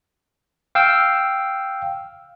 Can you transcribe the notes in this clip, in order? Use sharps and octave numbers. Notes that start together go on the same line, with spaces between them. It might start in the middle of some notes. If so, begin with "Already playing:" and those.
F5 G5 E6